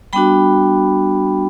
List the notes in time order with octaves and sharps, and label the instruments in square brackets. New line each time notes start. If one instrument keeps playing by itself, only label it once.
[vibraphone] G3 B3 D4 F#4 G5 B5